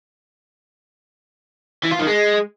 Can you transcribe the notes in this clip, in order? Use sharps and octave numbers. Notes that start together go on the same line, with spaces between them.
E3
F4
D#3
G#3